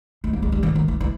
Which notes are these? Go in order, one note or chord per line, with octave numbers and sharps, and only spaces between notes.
G#3
A#3
G#3
G3
E3
D#3
E3
E3